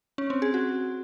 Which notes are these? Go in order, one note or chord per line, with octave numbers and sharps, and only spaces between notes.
C#4
C4
G#4
F#4